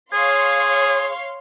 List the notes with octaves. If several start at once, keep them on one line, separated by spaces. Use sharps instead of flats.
G#4 C#5 F5 C6